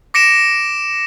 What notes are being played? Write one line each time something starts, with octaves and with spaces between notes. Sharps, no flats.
D6 A#6 C#7 D7 E7